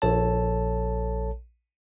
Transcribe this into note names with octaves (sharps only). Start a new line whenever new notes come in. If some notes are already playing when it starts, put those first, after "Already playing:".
A#1 A4 C#5 A5